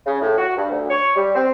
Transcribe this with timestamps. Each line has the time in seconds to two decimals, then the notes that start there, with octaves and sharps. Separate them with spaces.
0.06 C#3
0.20 A2
0.38 F#4
0.56 G2
0.71 D2
0.90 C#5
1.15 G3
1.35 C4